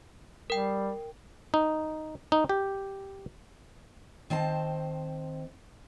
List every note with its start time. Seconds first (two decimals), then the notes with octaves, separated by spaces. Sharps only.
0.50 G3 A#4 G5
1.54 D#4
2.32 D#4
2.49 G4
4.30 D#3 C4 C5 A5